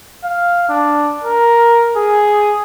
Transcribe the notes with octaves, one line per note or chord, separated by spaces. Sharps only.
F5
D4
A#4
G#4